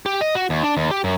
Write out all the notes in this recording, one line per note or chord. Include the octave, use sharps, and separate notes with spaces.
G4
D#5
F#4
D#2
D4
D#2
G4
F#2